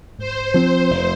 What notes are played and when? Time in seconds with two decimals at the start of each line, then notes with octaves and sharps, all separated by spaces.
0.19 G#2 C5
0.54 F3 C4
0.90 F1